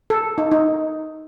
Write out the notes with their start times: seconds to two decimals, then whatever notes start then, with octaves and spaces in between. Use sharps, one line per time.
0.10 A4
0.38 D#4
0.51 D#4